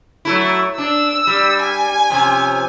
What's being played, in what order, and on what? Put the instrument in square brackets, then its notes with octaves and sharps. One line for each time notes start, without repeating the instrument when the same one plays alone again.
[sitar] F#3 A3 E4
[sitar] D4 [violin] E6
[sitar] G3
[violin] G#5
[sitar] C3 F3 C#4